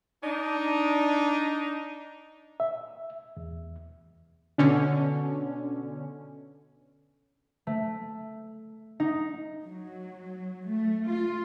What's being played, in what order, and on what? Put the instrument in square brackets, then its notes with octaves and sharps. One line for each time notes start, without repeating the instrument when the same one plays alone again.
[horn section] D4 D#4
[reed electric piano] E5
E2
[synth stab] B2 D3 C#4
[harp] A3
D#4
[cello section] F#3
A3
F4